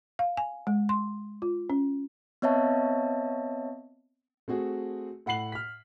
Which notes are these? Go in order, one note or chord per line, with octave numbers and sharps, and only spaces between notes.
F5
G#5
G#3
C6
F4
C#4
B3 C4 C#5 D#5 E5 A5
A3 C4 F#4 G#4
A2 F#5 B5 C7 F#7
F6 B6